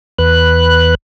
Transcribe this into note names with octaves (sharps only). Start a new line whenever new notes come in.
E2 B4 F#6